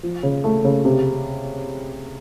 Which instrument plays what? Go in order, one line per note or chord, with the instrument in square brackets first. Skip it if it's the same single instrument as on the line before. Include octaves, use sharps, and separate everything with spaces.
[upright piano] F3
C#3
A3
C#3
C3